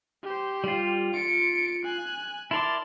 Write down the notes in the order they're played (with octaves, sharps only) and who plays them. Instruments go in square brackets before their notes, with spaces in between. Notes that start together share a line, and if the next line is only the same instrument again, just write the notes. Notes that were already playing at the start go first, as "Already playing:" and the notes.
[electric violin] G4 C5
[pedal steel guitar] G3 F4
[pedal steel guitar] F4 [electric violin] C#7 D7
[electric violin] G#5 F#6
[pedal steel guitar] E4 A#4 D5 [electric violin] A5 C6